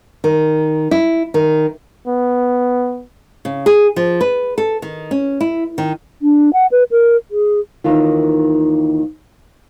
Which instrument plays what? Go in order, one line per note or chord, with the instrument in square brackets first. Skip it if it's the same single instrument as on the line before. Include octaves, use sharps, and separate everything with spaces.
[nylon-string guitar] D#3
E4
D#3
[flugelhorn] B3
[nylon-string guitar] C#3
G#4
F3
B4
A4
D#3
C#4
E4
D#3
[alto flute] D4
F#5
B4
A#4
G#4
[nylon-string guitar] D#2 D#3 E3 F4